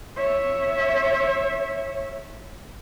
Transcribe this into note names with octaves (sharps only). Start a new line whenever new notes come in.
C#5 E5